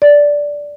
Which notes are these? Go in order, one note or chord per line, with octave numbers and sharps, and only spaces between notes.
D5